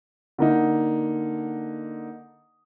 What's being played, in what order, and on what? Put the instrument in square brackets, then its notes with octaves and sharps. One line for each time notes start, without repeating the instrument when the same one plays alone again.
[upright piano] D3 A#3 D#4